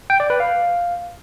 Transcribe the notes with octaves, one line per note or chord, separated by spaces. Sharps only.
G5
D5
B4
F5